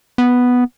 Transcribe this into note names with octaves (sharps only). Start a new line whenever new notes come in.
B3